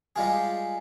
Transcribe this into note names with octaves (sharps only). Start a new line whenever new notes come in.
G3 G#3 F4 G#4